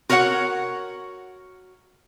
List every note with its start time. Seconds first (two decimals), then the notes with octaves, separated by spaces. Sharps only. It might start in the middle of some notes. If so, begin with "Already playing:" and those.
0.09 F#4 A#4 C#5 D#5 F#5